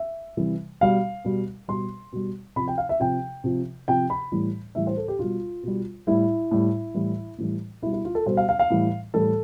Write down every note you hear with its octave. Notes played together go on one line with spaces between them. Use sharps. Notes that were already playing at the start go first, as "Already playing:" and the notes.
Already playing: E5
C3 E3 G3
B2 G3 F5
B2 G3
B2 G3 C6
B2 G3
C3 F3 B5
G5
F5
E5
C3 F3 G5
C3 F3
C3 F3 G5
B5
A2 E3 G3
A2 E3 G3 E5
C5
A4
G4
B2 G3 F4
B2 G3
A2 G3 E4
A2 G3
A2 E3 G3
A2 E3 G3
B2 G3 E4
E4
F4
A4
B2 G3 C5
F5
F5
F5
A2 E3 G3
A2 E3 G3 A4